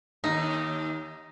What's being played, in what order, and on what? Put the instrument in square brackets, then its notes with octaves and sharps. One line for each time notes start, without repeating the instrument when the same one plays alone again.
[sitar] D#2 [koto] D#4